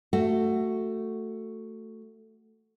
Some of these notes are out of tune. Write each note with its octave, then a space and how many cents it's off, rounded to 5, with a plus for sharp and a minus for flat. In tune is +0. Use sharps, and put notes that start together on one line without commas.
A3 +15 F#4 +0